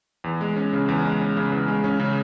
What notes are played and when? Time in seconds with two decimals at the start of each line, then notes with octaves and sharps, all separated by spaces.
0.24 E2
0.41 G#3
0.56 C#4
0.73 C#3
0.88 E2
1.05 G#3
1.21 C#4
1.37 C#3
1.52 E2
1.68 G#3
1.84 C#4
2.00 C#3